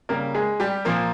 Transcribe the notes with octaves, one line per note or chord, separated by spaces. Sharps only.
C#3 G3 A#3 A#4
G#3 G#4
G3 G4
A#2 F3 A#3 A#4